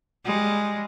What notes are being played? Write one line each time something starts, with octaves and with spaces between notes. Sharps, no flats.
G3 G#3